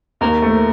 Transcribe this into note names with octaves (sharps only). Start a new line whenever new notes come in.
D#2 A#4
A3